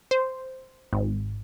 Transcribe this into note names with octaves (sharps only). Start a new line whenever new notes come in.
C5
G#1